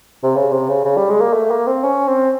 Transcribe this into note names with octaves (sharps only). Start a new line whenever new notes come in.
C3
C#3
C3
C#3
C#3
G3
G#3
A#3
A3
A#3
C4
C#4
C4